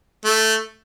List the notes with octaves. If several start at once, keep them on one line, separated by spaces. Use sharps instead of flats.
A3